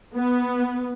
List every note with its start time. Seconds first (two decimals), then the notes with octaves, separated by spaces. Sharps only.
0.16 B3